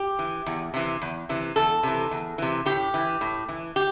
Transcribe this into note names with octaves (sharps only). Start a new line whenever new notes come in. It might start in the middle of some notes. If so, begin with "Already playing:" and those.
Already playing: G4
E3
E2
C3 E3
E2
C3 E3
E2 A4
C3 E3
E2
C3 E3
A2 G4
E3
A2
E3
G4